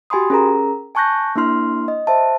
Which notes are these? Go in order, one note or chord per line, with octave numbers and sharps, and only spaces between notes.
F#4 G4 G#5 B5 C6 D#6
C#4 G#4 A#4 A#5
G#5 A5 C#6 F#6 G6 A#6
A#3 D4 E4 C6 F6
D#5
C5 E5 A5